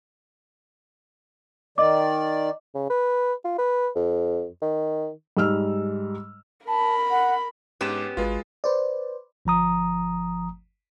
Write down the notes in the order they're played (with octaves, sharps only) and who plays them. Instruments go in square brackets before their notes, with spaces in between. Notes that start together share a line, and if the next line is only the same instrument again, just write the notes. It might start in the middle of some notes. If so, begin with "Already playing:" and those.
[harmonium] D#3 D5 [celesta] D#5 D6
[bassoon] C#3
B4
F4
B4
F2
D#3
[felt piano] G#2 G3 E6 F6
[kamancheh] A#4 B5 [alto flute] A5
[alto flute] F#5
[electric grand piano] G#2 E7 [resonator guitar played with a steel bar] B3 C#4 G4
[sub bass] G#1 [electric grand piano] G#3 F4 [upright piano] F#4 B4
[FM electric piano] B4 C5 D5
[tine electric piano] G1 F3 A#5 D#6